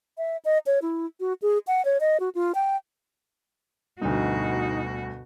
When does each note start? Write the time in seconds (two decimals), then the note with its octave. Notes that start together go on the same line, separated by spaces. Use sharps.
0.18 E5
0.45 D#5
0.66 C#5
0.82 E4
1.20 F#4
1.42 G#4
1.67 F#5
1.85 C#5
2.00 D#5
2.20 F#4
2.35 F4
2.55 G5
4.02 D2 G2 B2 D#4 F#4